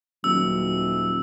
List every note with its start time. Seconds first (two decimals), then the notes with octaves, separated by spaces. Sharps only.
0.24 D#1 F#3 E6